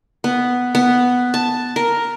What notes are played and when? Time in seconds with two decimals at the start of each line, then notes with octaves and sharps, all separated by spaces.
0.24 B3
0.75 B3
1.34 A5
1.76 A#4